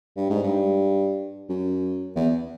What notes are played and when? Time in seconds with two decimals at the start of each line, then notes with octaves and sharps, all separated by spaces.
0.17 G2
0.30 G#2
0.43 G2
1.49 F#2
2.16 E2